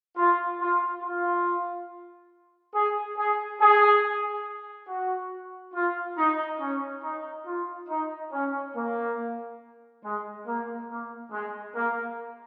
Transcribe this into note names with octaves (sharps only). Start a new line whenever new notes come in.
F4
F4
F4
G#4
G#4
G#4
F#4
F4
D#4
C#4
D#4
F4
D#4
C#4
A#3
G#3
A#3
A#3
G#3
A#3